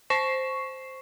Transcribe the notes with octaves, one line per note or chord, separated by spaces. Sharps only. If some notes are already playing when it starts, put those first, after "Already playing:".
C5 C#6 C7 E7